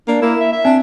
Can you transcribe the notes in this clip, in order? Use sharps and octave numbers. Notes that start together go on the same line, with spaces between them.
A#3 D4
A#3 E4
E5
E5
C4 D4